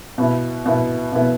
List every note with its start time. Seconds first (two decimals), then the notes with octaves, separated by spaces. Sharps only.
0.18 B2 B3 E4
0.65 B2 B3 E4
1.12 B2 B3 E4